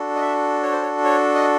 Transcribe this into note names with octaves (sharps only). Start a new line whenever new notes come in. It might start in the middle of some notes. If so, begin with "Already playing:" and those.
Already playing: D4 F#4 A4
D#5
E5
C#5
C5
C#5
C#5
D#5